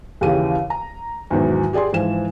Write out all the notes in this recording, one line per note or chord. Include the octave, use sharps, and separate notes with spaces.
D#2 C#3 E3 G4 D#7
A#5
E2 G#2 B2 D#3 E3 F#3
G4 G#4 D5 G#5 C6
G#2 E3 F3 G#5 E7